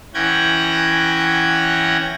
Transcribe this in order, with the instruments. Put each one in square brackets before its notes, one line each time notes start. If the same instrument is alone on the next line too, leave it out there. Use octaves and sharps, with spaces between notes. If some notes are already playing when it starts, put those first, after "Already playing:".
[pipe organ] E3 C#4 F#5 G5 G#6 A#6